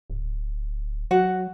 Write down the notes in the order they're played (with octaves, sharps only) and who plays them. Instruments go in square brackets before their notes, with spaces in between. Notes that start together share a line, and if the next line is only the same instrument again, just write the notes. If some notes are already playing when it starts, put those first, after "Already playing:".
[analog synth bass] D1
[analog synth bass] F#3 [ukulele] F#4 F#5